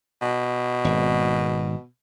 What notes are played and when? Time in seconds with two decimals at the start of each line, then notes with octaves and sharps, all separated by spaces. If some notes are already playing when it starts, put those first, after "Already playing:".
0.22 B2
0.84 G#1